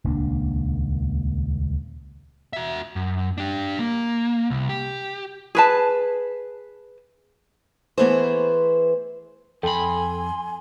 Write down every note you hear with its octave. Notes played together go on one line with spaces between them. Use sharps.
D#1 C#2 A#3 D4
F#4 E5
F#2
D4 G4
A#3
C2
G4
G#4 B4 A5
E3 A3 B3 E4 G#4 C5
F2 A4 G5 G#5 B5 C6